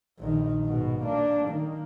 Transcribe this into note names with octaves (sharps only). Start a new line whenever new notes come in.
A#1 D#3
G#2 B2
A#3 D4
D#3 A#3